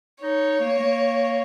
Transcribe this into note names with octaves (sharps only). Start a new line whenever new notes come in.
D#4 C#5
A#3
A#3